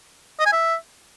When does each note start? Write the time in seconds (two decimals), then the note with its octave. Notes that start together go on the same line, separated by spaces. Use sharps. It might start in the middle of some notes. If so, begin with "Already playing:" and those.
0.39 D#5
0.46 G#5
0.52 E5